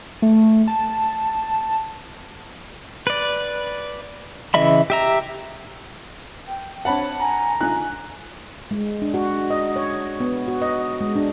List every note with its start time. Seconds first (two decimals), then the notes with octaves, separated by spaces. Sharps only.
0.22 A3
0.68 A5
3.07 B4 D5
4.54 C#3 E3 D#5 E5 B5
4.90 G4 E5 A#5
6.48 G5
6.85 C4 D4 C#5 F#5 A5 B5
7.20 G#5 A#5
7.61 D3 D#4 F4 G#5 F#6
8.71 G#3
9.02 D4
9.14 F#4
9.50 D#5
9.76 C#5
10.20 B3
10.48 F#4
10.62 D#5
11.01 G#3
11.16 D4